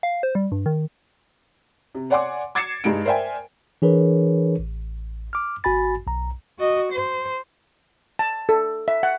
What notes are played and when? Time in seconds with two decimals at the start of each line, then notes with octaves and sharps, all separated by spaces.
0.03 F5
0.23 C5
0.35 G3
0.52 G2
0.66 D#3
1.95 C3
2.10 C#5 D5 F#5 G#5 C6 D6
2.55 D6 G#6 A6 C7 C#7 E7
2.84 G2 G#3 D#4 D7
3.05 A#4 C5 D5 E5 G5 G#5
3.82 E3 D4 G#4 A#4 B4 C#5
4.59 A1
5.33 D6 F6
5.64 G#1 F#4 G#5 B5 A6
6.07 B1 A#5
6.58 F#4 D#5
6.92 C5
8.19 A5
8.49 A4
8.88 E5
9.03 F#5